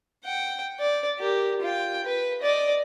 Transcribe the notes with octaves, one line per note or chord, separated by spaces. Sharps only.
F#5 G5
D5
G4 A#4
F4 G5
B4
D5 D#5